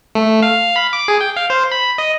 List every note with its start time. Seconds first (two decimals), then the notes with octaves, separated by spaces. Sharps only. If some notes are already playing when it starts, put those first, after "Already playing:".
0.15 A3
0.43 F5
0.76 B5
0.93 D6
1.08 G#4
1.21 G5
1.36 F5
1.50 C5
1.71 B5
1.98 D#5